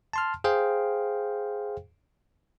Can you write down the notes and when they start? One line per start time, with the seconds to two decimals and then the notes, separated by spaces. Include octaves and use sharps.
0.13 A5 C6 F6
0.44 G#4 C5 F5 G5